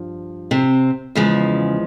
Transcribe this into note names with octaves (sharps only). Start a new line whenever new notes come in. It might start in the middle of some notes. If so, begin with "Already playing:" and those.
Already playing: G2 F3
C3 C4
E2 C#3 F3 G#3